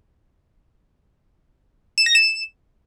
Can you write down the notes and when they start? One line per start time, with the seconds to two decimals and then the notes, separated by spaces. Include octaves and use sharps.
1.98 E7
2.06 A#6
2.15 E7